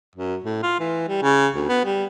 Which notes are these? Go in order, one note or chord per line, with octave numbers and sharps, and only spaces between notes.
F#2
A2
F4
E3
G3
C#3
D2
B3
G3